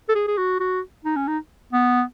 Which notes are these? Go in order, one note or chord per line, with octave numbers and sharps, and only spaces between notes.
A4
G#4
G#4
F#4
F#4
D#4
C#4
D#4
B3